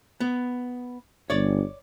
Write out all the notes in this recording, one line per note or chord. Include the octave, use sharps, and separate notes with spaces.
B3
G1 C#5 D5